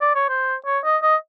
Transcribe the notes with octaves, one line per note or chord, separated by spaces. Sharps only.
D5
C#5
C5
C#5
D#5
D#5